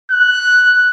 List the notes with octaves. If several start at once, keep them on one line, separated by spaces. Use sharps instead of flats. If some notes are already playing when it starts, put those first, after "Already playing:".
F#6